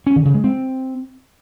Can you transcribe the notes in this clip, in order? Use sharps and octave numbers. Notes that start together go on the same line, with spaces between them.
C#4
D#3
C#3
G#3
C4